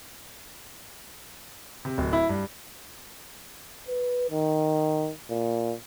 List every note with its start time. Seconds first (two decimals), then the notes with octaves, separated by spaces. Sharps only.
1.85 C3
1.98 D1
2.13 E4
2.29 G2
3.88 B4
4.31 D#3
5.30 A#2